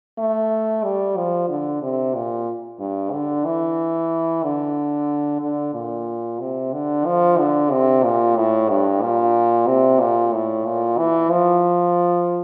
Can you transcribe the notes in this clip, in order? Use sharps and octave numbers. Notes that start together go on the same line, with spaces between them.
A3
G3
F3
D3
C3
A#2
G2
D3
E3
D3
D3
A#2
C3
D3
F3
D3
C3
A#2
A2
G2
A#2
C3
A#2
A2
A#2
E3
F3